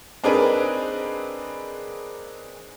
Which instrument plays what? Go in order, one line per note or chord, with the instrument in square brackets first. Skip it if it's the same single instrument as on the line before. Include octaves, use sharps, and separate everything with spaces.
[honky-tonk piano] C4 D4 D#4 G#4 A#4 B4